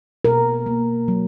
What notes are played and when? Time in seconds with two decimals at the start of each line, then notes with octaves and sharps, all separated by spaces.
0.25 B2 A#4
0.66 A#3
1.08 F#3